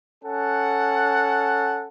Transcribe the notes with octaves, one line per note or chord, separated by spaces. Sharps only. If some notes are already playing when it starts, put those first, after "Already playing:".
C#4 A4 F#5